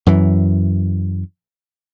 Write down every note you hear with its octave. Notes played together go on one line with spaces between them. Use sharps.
F#2 E3